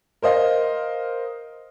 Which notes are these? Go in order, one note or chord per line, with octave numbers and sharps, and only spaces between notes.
A#4 C5 D#5 F5